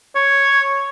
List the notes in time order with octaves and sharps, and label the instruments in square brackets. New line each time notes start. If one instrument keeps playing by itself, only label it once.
[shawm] C#5